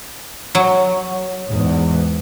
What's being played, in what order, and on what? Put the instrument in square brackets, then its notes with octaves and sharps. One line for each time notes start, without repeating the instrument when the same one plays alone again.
[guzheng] F#3
[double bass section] E2 G#2